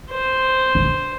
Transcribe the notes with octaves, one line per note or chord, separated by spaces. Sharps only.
C5
D4